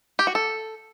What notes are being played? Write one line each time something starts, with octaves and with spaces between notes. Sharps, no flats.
G4
F#4
A4